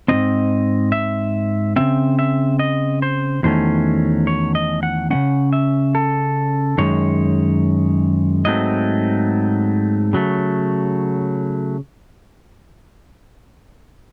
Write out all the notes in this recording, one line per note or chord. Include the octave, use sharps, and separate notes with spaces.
G#2 E3 C4 D#5
E5
C#3 E3 C4 E5
E5
D#5
C5
E2 D#3 F#3 A3 C#4 C5
C#5
D#5
F#5
C#3 G#3 C#4 F#5
E5
A4
F#2 D#3 G#3 C#5
G#2 F#3 A3 C4 D#5
C#3 F#3 A3